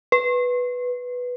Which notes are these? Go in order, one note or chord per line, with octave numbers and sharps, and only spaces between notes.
B4